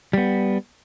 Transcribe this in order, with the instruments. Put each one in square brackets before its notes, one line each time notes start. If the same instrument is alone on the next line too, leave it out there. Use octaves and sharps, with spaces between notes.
[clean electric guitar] G3 B3